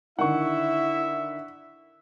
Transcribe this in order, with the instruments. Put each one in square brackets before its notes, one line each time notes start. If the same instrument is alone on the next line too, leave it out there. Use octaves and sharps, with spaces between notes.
[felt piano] D3 D#3 [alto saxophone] E4 [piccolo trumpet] E5 [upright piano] F#5 C#6